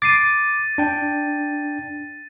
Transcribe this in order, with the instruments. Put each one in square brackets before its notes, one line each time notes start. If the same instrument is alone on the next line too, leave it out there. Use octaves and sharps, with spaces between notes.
[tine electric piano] D6 [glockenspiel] A6 C7 D#7
[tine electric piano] D4 G5